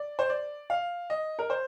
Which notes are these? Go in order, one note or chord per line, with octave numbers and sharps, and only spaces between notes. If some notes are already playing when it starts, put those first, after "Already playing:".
Already playing: D5
C5
D5
F5
D#5
A#4
C5